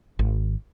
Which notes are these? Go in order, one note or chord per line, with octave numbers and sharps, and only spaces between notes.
G#1